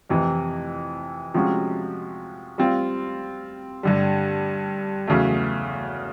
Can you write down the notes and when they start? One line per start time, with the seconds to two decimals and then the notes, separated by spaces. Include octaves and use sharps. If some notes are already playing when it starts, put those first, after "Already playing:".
0.10 F2 C3 E3
1.34 C3 F3 G#3 C#4 F#4
2.58 G3 C4 F4
3.83 G2 D3 G3
5.07 E2 C#3 F#3 A3